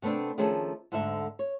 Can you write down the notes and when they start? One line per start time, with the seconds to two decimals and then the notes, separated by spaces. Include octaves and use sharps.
0.02 C3 A3 B3 C4 D4
0.38 D#3 F3 A3 C#4 G#4 A4
0.92 D2 G#2 D3 A4 E5
1.39 C#5